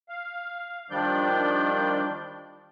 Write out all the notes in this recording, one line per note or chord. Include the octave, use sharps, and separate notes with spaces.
F5
D#3 F3 G3 D4 D5 G6